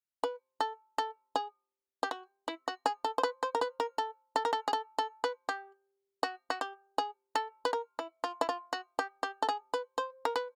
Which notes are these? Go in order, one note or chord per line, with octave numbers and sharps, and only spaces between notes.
B4
A4
A4
G#4
G4
F#4
E4
F#4
G#4
A4
C5
B4
C5
A#4
B4
A#4
A4
A4
A#4
A4
G#4
A4
A4
B4
G4
F#4
F#4
G4
G#4
A4
B4
A#4
E4
F4
E4
F4
F#4
G4
G4
A4
G#4
B4
C5
A#4
B4